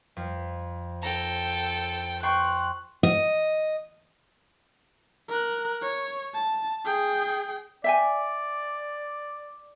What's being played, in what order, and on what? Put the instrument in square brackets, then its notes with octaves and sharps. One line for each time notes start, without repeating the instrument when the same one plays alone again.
[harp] F2
[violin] A4 G5 [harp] A#5
[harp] G5 C6 C#6 [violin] F#6
[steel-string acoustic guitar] D#5
[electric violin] A#4 F#6
C#5
A5
G#4 G5
[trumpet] D5 [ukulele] E5 G5 G#5